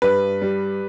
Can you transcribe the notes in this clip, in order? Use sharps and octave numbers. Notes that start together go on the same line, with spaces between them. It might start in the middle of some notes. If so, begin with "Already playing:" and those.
G2 B4
G3